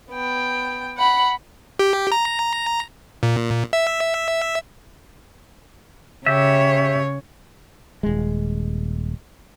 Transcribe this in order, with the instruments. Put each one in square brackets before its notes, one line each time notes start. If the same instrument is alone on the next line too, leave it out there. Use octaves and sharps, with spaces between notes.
[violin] B3 G5
F#5 B5
[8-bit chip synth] G4
A#5
A#2
E5
[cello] C#3 C#5 [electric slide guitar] G4 E5
[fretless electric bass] D#1 G#3